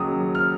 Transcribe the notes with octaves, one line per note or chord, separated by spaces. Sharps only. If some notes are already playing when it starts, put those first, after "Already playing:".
Already playing: D#2 C#3 F#3 D#6
F6